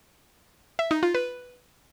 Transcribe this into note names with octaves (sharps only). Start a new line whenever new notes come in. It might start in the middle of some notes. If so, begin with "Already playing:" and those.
E5
D#4
F4
B4